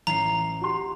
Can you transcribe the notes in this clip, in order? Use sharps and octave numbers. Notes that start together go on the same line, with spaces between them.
A1 A#5 C7
F#4 G4 C6